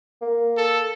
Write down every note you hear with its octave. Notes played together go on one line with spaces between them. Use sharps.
A#3
A4